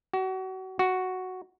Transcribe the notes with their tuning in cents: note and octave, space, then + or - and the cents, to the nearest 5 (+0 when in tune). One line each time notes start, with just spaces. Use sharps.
F#4 +30
F#4 +0